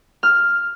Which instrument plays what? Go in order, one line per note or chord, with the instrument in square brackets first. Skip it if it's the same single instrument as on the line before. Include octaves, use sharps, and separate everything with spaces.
[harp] F6